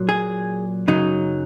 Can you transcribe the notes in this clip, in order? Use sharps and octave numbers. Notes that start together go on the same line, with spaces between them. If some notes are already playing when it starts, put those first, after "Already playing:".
Already playing: A#2 F#3
G#4
F#2 C#3 F#3 D#4